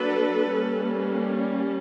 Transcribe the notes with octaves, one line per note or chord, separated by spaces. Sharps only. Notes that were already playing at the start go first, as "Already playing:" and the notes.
Already playing: F#3 A#3 D4 A4 B4
G3 A#3 C#4